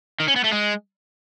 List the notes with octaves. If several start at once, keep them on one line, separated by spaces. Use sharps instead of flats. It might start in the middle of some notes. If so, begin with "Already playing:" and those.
D#3
C#4
B3
A3
G#3